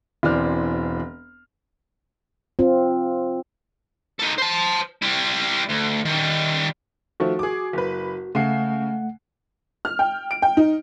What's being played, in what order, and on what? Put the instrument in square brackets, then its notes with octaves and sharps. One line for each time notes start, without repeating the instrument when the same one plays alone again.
[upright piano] E1 E3 C4 D5 F6
[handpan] C4 F4
[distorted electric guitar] D#4 A4
C5 A5
G3 E4
D2
D#3 G3
[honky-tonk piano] D#3 F3 A3 [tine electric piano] F#4
[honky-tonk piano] G#4 D6
F#1 B4
[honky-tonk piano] C#3 C7 [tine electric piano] A3 F#5
[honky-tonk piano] F6
G5
D7
G5
D#4